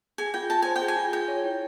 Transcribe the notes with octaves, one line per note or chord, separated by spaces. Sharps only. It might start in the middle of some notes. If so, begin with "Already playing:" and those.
G#4 G#5
F4 G5
F4 A5
C5 G#5
G5
G#4
G#5
F4
G#4 G5
C#5
E4